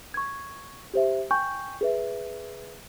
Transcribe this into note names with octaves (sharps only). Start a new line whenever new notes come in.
C#6 G#6
G4 C5 E5
G5 G#5 C#6 G6
G#4 B4 E5